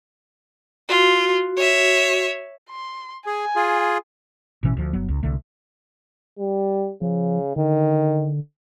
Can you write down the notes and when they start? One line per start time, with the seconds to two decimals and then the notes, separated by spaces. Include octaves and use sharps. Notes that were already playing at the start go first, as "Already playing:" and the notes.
0.89 F4 F#4
1.57 C#5 E5
2.70 C6
3.27 G#4 G#5
3.56 F4 G#4
4.63 A1 B2 E3 C#4
4.77 D2 F3
4.93 G1 F#3 B3
5.08 C#2
5.23 C2 D3 A3
6.39 G3
7.02 C#3 F3
7.56 D3 D#3